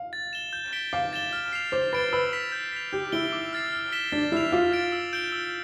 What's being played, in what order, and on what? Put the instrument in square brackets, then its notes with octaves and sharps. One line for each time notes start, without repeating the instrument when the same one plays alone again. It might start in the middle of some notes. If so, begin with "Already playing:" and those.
Already playing: [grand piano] F5
[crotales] A6
E7 G7
G6
B6 D7 G7
[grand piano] F5 [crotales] D6
[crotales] A6 E7 G7
F6
C7 F7
[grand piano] C5 [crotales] D6
[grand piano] B4 [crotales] A6 D7 G7
[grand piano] B4 [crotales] E6
[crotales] B6 F7
G6
B6 F7
[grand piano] G4 [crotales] G6
[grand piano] E4 [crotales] D7 G7
[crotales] D6
F6 A6 C7
F6
B6 E7 G7
[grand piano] D4 [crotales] A6
[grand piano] E4 [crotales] C7 F7
[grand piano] F4 [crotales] D6
[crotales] A6 D7
E6
G6 D7 G7
E6